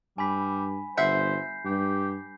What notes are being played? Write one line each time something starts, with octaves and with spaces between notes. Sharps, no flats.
G2 G3 G#5 B5 B6
G1 C5 E5 F#5 G6 B6 C7
G2 G4